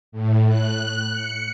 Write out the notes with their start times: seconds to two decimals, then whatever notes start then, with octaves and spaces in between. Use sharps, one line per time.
0.12 A2
0.48 F#6
1.12 C#7